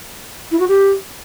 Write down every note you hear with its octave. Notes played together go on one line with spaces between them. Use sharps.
E4
F#4
G4